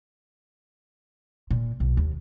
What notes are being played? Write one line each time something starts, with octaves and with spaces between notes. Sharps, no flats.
A#2
B1
D#2